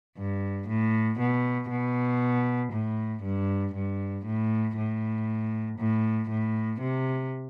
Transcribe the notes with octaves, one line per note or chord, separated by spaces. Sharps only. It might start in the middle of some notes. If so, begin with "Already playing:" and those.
G2
A2
B2
B2
A2
G2
G2
A2
A2
A2
A2
C3